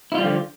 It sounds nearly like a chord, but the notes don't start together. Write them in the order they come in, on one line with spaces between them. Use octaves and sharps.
E4 F4 G3 F3 D3